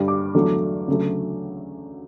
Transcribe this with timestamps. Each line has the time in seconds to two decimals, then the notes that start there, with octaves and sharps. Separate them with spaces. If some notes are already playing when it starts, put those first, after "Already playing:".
Already playing: G2 D3 G3
0.08 D6
0.34 E2 D3 F#3 A3
0.88 D2 C#3 F#3 A3